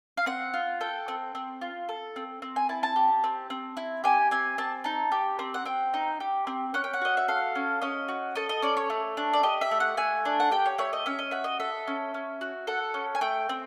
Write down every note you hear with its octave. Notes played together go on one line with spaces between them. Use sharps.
F5
C4 F#5
F4
A4 G5
C4
C4
F4
A4
C4
C4
G#5
E4 A5
A5
G4
C4
C4
E4
G4 G#5
C4 G#5
C4 A5
D#4 A5
G4
C4
F#5
C4 G5
D#4
G4
C4
C#4 F#5
G5
F#5
F#4 D#5
E5
A4 F5
C#4
C#4 D#5
F#4
A4 D#5
D#5
C#4 D5
C#5
A3
D4
D5
G4 D#5
E5
A3
F#5
A3 G#5
D4
F#5
G4 G5
C#5
A3 C#5
D#5
C#4 E5
D#5
F#4 E5
D#5
A4 E5
C#4
C#4
F#4
A4 F#5
C#4
G#5
A3 G5
C4